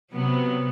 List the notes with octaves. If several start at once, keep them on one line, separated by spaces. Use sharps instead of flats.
C3 F#3 B3